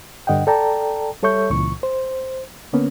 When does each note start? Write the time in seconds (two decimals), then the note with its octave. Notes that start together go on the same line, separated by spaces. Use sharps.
0.27 G2 D3 D#5 F#5 G5
0.47 A4 D5 G5 A5 A#5
1.23 G3 A4 C#5 E5 C#6 G6
1.50 C#2 A#2 E3 C#6
1.83 C5
2.73 D3 A#3 B3 C#4